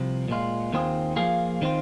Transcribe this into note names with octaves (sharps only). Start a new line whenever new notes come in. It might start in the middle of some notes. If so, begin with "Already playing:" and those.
Already playing: C2 C3 F3
A#2 G#3 F4
D#2 D#3 C4 F4 G#4
F3 A#3 F4 G#4 F5
D#3 C4 F4